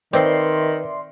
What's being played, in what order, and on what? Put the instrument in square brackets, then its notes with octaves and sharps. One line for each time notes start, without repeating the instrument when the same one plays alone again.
[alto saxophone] D#3 [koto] C4 [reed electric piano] B4 [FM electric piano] D5 E5 C6